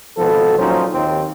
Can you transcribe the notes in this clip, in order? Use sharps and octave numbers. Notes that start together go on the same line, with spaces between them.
G#1 B2 F3 B3 A4
A#2 F3 F#3 C#4 D#4 C5
D#2 C4